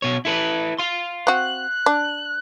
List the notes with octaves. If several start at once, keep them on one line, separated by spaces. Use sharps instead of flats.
B2 C#5
E4 A4 B4
F5 C6
C4 F#4 F#6
D4